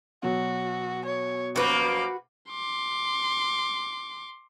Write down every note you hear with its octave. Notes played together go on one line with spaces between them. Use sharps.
B2 F#3 F#4
C#5
F#2 F3 A#3 F#4 B4 D6
C6 D6